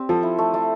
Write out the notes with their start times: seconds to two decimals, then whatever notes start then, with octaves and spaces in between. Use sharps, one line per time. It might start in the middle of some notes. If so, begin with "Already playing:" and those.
Already playing: C4 G4 D5
0.09 F3 A4
0.23 E4
0.38 A3
0.54 A3